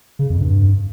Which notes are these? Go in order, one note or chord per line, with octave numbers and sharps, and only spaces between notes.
C#3
F2
G2